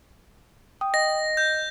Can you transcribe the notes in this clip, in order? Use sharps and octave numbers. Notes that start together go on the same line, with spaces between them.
G5 D#6
D#5 A#6
G6